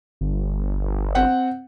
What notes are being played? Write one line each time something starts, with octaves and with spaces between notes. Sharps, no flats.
G1
C4 F#5